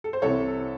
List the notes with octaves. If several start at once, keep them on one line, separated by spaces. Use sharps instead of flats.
A4
C5
C2 C3 E3 A4 C#5